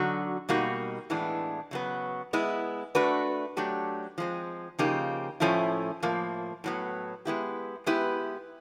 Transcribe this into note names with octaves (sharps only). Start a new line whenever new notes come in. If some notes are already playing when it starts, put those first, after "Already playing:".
Already playing: D3 F#3 D#4 F#4
B2 G3 A#3 D#4 F#4
A2 E3 G#3 B3 D4
C#3 F#3 B3
G#3 B3 E4
A3 D4 F#4 B4
F#3 A3 D4 G4
F3 G#3 C4
C#3 F3 A#3 D#4 G4
A2 F3 A3 C#4 E4
A2 F3 A#3
A2 F#3 B3
G#3 B3 E4 G4
G#3 B3 E4 G4 B4